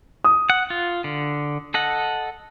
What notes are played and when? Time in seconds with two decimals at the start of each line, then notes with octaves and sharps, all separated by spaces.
0.24 D#6
0.50 F#5
0.70 F4
1.04 D3
1.74 A4 D#5 F#5